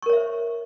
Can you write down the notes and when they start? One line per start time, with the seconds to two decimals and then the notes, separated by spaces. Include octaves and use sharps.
0.02 C#6
0.06 A#4
0.10 C#5
0.13 E5
0.17 C5